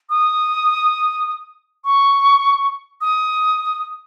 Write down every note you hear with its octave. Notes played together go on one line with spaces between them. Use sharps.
D#6
C#6
D#6